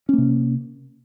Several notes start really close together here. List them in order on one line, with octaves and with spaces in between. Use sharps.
C#4 A#3 C3